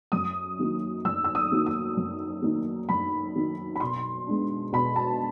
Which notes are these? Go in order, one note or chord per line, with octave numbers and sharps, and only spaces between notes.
F#2 D#6
D#3 F#3 A#3 D#4
F#2 E6
E6
D#6
D#3 F#3 A#3 D#4
D#6
F#2
D#3 F#3 A#3 D#4
F#2 B5
D#3 F#3 A#3 D#4
B5
B2 C6
G#3 B3 D4
B2 B5
A5